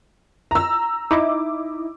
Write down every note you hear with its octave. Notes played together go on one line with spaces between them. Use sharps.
A#5 E6
D#4 E4 D6